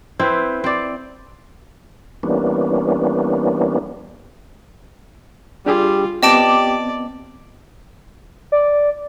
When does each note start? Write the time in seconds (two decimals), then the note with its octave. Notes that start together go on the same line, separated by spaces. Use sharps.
0.19 C4 E4 B4 C5
0.64 C4 D5
2.23 E3 G3 A#3 B3 C#4 D4
5.66 G3 D4 F4 G4 G#4
6.23 B3 C4 G4 D5 D#5 A5 D7
8.52 D5